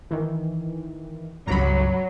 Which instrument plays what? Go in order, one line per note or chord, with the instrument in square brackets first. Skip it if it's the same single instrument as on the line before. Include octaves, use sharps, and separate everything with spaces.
[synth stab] D#3 E3
[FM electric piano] C#2 G2 [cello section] F#3 [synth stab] A#5 B5